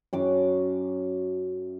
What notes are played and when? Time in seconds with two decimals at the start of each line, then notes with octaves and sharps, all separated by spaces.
0.13 F#2 D6